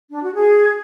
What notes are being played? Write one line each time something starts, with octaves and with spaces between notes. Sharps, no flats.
D4
F#4
G#4